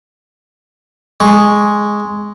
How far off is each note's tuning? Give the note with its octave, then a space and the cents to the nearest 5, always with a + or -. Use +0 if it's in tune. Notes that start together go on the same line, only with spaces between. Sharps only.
G#3 +0 C#6 +0